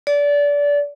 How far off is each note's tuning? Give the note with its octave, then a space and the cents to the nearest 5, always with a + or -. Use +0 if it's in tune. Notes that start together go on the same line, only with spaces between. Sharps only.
D5 -25